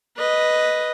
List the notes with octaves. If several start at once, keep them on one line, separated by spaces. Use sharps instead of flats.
B4 D#5